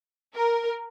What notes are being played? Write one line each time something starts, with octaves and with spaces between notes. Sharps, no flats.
A#4